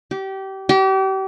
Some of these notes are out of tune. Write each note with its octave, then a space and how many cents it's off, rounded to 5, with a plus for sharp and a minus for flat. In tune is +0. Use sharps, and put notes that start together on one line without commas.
G4 -25
G4 -35